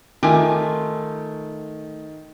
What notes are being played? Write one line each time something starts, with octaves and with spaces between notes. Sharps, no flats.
D#3 A3 F4 G4 G#5